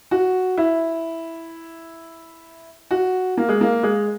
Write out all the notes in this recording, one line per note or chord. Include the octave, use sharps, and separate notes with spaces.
F#4
E4
F#4
A#3
G#3
A#3
G#3